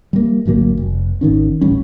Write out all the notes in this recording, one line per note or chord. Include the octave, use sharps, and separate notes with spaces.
G3 A#3
G#1 D2 F#3 A#3
F1
G#1 D#3 C#4
D#1 A1 G3 C#4